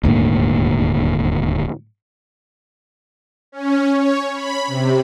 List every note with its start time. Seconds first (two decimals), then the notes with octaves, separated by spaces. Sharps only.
0.03 D#1 D2 G#2 A#3
3.52 C#4
3.93 C#5
4.34 B5
4.67 C3